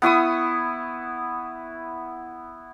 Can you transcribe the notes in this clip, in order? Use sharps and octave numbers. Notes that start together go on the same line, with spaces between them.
B3 E4 C#6 D#6